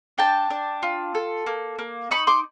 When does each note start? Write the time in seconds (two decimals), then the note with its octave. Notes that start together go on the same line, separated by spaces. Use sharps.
0.18 D4 G5 A5
0.50 D4
0.83 F4
1.15 A4
1.46 A#3
1.79 A#3
2.11 D#4 B5 C#6
2.27 C6 D6